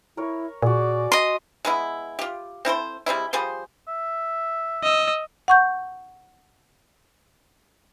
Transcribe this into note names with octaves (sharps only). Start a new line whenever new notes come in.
E4 A#4 C#5
A#2 F#4 G#4 D5
D#5 C6
G#3 B3 E4
F4 G4
C4 E4 A4 C5
G3 G#3 C4 E4
F3 G3 G#4 C5
E5
D#5 E6
F#5 C#6 G6